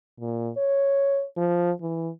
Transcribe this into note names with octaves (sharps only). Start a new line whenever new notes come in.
A#2
C#5
F3
E3